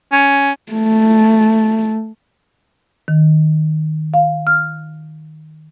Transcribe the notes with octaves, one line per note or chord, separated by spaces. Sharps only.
C#4
A3
D#3
F5
F6